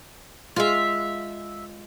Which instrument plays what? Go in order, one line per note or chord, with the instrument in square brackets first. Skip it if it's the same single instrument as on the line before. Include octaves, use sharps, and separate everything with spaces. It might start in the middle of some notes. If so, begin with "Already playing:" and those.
[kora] G#3 F4 [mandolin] E5 F5